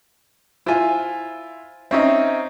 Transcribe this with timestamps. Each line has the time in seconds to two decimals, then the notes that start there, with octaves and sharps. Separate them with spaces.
0.66 E4 F4 C5 G#5
1.91 C4 C#4 D#4 E5